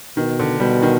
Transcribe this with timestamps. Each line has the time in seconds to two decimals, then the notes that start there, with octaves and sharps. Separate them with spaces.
0.17 B2 D#3
0.40 D3
0.60 B2 G3
0.82 D#3